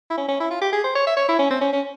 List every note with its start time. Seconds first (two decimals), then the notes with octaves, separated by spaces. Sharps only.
0.10 E4
0.17 C#4
0.28 C#4
0.40 E4
0.50 F4
0.61 G4
0.72 G#4
0.84 C5
0.95 C#5
1.07 E5
1.17 C#5
1.28 E4
1.39 C#4
1.50 C4
1.61 C#4
1.73 C#4